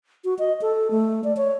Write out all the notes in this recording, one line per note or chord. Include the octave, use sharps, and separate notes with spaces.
F#4
D#5
A4
A3
D5
C#5